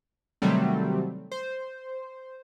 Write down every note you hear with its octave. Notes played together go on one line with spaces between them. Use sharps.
C3 D#3 F#3 G3 A3 C4
C5